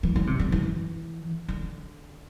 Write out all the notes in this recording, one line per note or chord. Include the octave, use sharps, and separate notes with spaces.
E3
D3
C3
D3
E3
D3